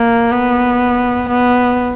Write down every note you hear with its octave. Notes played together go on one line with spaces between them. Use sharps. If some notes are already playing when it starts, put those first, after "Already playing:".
Already playing: A#3
B3
B3